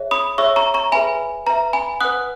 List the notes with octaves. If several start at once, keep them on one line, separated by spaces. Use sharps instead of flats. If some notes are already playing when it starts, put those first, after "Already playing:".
Already playing: G#4 C#5 E5
B5 D#6
G#4 C#5 E5 C#6 E6
A#5 C#6
A#5 C#6
G#4 B4 E5 G#5 B5
B4 E5 A#5
G#5 B5
B4 F#5 D#6 F#6